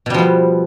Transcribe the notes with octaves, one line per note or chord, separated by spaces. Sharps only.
B2 F3 G3 B3